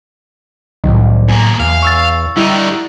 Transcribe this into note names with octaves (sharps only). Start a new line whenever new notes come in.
C2 A2 D#3 F#3
E2 A#3 G#5
E2 F5
C#6 E6 A6
D3 G3 D#4 E4